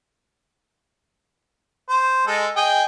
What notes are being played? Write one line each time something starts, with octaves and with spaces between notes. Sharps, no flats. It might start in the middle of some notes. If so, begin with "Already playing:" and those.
C5
G#3 A4
G#4 D#5 G5